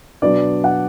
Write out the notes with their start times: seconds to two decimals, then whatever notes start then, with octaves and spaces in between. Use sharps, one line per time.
0.22 B2 F#3 B3 D4 D5
0.64 F#5